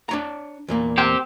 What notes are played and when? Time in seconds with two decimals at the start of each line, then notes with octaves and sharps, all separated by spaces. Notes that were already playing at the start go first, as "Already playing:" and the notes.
0.09 D4 C#5 A#5
0.68 E2 A#2 A#3
0.98 C4 G4